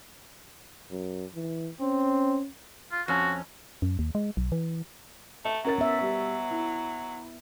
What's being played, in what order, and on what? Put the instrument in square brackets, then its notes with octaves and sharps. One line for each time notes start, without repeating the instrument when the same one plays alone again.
[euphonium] F#2
E3
[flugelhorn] C4 [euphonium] C#4
[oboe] F4
[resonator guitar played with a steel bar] F2 C#4 [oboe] F#4
[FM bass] F#2
D#2
G#3
B1
E3
[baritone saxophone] A3 [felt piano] E5
[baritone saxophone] F#3 [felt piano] C#4 A#4 A6
[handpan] B3 E5
[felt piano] G3 C#6
E4